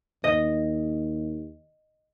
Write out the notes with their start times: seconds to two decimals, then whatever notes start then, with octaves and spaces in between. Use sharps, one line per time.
0.24 D#2 D#5